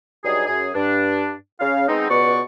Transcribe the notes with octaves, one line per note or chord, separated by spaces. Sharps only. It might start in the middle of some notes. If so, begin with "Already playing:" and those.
G2 F#3 G3 D#4 G#4
F#2 G#4
G2 D4
C#3 F5
G#3 B3 C4 D#4
C#2 B2 B3 B4 D5 C#6